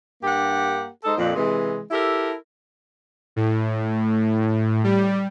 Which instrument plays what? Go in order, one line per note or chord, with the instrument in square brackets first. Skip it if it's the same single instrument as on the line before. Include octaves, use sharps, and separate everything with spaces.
[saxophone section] G2 A#3 G4 F#5
G#3 D#4 A4 C5
F2 A#2
C3 E3 G#3
E4 G4 A4 A#4
[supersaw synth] A2
G3